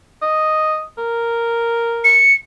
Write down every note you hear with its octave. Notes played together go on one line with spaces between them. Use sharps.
D#5
A#4
C#7